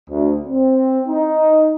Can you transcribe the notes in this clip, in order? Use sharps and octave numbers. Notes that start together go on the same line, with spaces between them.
D2
C4
D#4